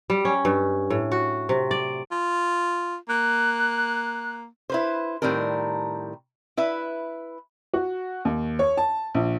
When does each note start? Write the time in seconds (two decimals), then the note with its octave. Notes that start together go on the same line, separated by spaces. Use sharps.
0.10 G3
0.25 C#4
0.45 G2
0.90 A2
1.12 F#4
1.49 C3
1.71 D5
2.12 F4
3.09 A#3 F#6
4.70 E4 B4 C5
5.22 A2 D#3 G3 C4 A#4
6.57 E4 B4 E5
7.74 F#4
8.25 D#2
8.59 C#5
8.77 A5
9.15 A#1